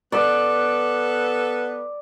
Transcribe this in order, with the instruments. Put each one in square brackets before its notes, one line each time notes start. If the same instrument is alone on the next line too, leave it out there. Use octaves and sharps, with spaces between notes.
[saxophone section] B3 A4 B4 [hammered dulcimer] D5